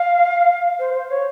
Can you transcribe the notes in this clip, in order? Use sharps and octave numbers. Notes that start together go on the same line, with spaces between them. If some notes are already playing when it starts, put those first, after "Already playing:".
Already playing: F5
C5
C5
C#5